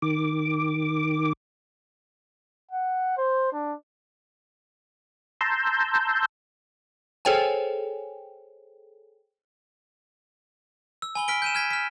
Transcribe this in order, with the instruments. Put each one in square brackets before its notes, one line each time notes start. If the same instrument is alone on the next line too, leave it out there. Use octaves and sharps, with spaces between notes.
[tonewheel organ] D#3 D6
[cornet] F#5
C5
D4
[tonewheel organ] A5 A#5 C6 E6 G6
[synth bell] G#4 A4 C5 C#5 G5 G#5
[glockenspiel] E6
G#5 B5 G7
F6 B6 D7 G7
G6 D#7 E7
F6 G#6 B6
F6 B6